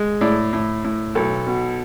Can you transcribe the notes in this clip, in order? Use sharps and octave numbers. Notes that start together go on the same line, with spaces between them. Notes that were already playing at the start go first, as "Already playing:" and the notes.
Already playing: G#3
A2 D5
A2
A2
B1 A4
B2